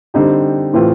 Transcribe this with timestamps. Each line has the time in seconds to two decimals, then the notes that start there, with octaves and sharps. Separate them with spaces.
0.14 D3 G3 C4 D#4 G4
0.73 A2 E3 A3 C4 F4